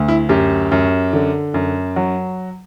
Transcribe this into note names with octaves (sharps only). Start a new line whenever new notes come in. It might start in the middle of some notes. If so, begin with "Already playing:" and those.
Already playing: D2
E4
F#2 G4
F#2
D3
F#2
F#3